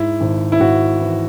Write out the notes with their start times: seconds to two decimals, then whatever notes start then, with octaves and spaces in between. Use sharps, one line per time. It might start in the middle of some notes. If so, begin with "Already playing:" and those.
Already playing: G#2 E4
0.21 G#1
0.52 E4
0.60 G#1 F#4
1.00 E3